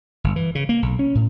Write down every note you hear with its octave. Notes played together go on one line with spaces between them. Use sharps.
G1
E3
C#3
A#3
B1
C#4
A2